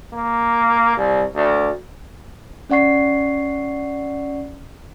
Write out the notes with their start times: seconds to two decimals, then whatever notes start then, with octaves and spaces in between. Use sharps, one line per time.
0.13 A#3
0.97 C2
1.35 D2
2.70 C#4 D5 F#5 C#6 C7